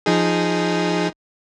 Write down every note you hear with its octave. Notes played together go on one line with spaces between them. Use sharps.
F3 D#4 G#4